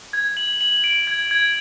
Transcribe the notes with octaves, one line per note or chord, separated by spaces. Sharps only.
G#6
F#7
F#7
D7
G#6
G#6